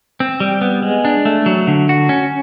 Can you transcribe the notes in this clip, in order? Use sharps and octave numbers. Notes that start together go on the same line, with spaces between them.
C4
G3
B3
G#3
D4
A3
F#3
D3
F#4
C#4